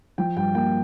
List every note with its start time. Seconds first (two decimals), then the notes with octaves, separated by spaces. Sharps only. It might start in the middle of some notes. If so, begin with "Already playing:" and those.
0.18 F3 G5
0.36 G2 G5
0.55 A#3 G5